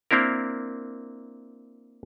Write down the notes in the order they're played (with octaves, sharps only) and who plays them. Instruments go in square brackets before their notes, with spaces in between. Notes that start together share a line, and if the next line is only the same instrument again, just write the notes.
[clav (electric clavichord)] A#3 C4 D4 E4 A#4